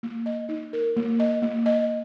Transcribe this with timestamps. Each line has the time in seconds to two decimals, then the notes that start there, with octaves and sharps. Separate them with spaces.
0.03 A#3
0.26 D#5
0.49 D#4
0.73 A#4
0.97 A#3
1.20 D#5
1.42 A#3
1.66 D#5